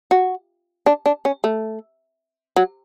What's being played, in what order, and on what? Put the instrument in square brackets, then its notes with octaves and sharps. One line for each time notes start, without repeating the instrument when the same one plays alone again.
[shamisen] F#4
D4
D4
C#4
A3
F#3